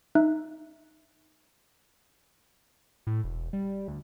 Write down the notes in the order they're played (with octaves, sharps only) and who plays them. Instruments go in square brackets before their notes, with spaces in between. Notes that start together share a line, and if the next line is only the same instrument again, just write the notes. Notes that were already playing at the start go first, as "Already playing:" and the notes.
[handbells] D#4 E5 F#6
[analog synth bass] A2
E1
G3
D2